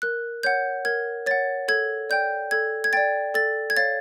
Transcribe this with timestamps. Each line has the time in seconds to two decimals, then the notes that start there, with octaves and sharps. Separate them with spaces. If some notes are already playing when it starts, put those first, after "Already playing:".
0.02 A#4 F#6
0.43 C#5 F#5 G6
0.85 A#4 G#6
1.26 C#5 F#5 A6
1.68 A4 G#6
2.10 D5 G5 G6
2.51 A4 G#6
2.84 G#6
2.93 D5 G5 A6
3.34 A4 A6
3.70 G#6
3.77 C#5 F5 A6